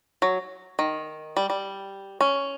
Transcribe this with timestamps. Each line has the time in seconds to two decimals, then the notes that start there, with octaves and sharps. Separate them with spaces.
0.22 F#3
0.79 D#3
1.37 G3
1.50 G3
2.21 C#4